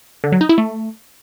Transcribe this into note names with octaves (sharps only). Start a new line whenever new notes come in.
D3
F#3
D#4
E4
A3